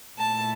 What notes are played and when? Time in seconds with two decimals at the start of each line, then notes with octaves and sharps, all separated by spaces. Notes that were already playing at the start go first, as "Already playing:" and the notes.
0.17 A#2 A3 E4 A5